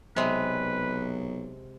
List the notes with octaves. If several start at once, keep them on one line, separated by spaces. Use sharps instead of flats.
B1 C3 G#3 B4